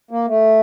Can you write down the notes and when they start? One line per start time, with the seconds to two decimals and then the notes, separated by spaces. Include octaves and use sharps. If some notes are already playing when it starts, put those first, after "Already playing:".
0.11 A#3
0.27 A3